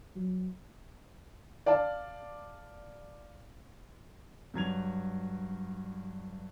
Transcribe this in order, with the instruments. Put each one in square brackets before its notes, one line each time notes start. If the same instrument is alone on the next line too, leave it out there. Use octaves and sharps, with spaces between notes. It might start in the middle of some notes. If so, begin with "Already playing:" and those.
[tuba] F#3
[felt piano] D5 F5 A5
[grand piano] G2 F#3 G#6 F7